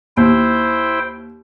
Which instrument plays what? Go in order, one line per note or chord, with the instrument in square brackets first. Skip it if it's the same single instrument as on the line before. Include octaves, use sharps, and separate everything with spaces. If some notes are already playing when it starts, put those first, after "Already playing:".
[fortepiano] D#2 [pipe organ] E4 C5 G5